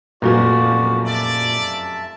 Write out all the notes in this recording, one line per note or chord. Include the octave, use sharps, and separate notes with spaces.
F1 F#2 A#2 F3 F#4 D5
D5 E5 A5